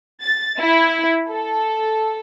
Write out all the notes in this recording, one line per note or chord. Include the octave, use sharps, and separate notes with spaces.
A6
E4
A4